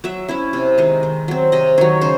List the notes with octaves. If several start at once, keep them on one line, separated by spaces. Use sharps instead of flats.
F#3 E5
C#4 E4 E5
C3
D#3 G#3 D#4
D#3
F#3 C4
C3 D#5
D#3 F#3 C#5
C#3 C5